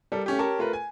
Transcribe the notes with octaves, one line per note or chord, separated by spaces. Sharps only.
G3 A4 A#4
A3 C#4 G4
G4 A#4 C#5 A5
A3 F4 A#4 B4
G#5